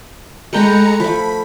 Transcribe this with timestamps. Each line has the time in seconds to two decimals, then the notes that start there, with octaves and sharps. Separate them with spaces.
0.53 G#3 A3 B4 G5 A#5 C#7
1.00 F3 A3 B5